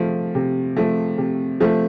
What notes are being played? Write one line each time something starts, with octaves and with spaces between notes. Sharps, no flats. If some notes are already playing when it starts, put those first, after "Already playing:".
Already playing: C3 F3 A3
C3
F3 A3
C3
F3 A3